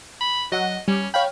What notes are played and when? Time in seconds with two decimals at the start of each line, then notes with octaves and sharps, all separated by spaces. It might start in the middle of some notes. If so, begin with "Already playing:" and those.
0.21 B5
0.52 F#3 D#5 F#5
0.88 G3 C#4
1.14 C#5 F5 G5 B5